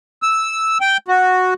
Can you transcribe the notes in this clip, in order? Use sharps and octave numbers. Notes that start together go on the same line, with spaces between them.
E6
G5
F#4